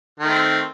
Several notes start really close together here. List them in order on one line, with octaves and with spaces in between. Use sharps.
D#3 A3 C4